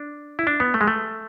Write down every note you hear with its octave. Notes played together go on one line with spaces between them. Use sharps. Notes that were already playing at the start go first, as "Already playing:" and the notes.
Already playing: D4
E4
D4
B3
A3
G#3
A3